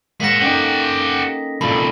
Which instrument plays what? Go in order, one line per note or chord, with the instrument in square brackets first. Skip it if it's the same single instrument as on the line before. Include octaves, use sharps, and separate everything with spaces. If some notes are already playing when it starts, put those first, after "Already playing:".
[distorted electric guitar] G#3 F#5 [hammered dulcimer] A#3 [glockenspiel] A#6 B6
[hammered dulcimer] C#4 D#4 [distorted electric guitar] G4 F#5 [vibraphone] A4 G5
[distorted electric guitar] C2 A#2 [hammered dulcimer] F4 A4 [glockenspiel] B5